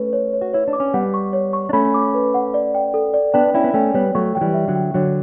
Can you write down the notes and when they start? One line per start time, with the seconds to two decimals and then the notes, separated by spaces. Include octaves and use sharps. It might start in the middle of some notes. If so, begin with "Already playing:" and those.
Already playing: A3 C#4 B4
0.13 C#5
0.33 C#5
0.41 F#4
0.53 E4 C#5
0.68 D4
0.73 D6
0.80 C#4
0.94 G3 B3 F#5
1.14 C#6
1.33 C#5
1.53 C#6
1.69 D4
1.73 A3 C#4 B5
1.94 D6
2.14 B4
2.34 F#5
2.54 D5
2.75 G5
2.94 A4
3.14 D5
3.34 B3 D4 G5
3.54 C#4 E4 G5
3.64 B3
3.74 A3 C#4 G5
3.94 G3 B3 C#5
4.15 F#3 A3 C#6
4.35 F#3 G5
4.41 E3 G3
4.54 E5
4.67 D3 F#3
4.75 G5
4.94 D3 F#3 C#5